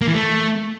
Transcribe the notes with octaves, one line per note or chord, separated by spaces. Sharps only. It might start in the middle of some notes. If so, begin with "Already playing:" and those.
A#3
E3
A3